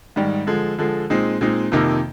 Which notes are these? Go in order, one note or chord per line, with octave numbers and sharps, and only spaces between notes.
G#2 D#3 G3
D3 F3 G#3
D3 F3 G#3
A#2 G#3 C4 D#4
A#2 G#3 C4 D#4
F2 C3 D#3 A#3 D#4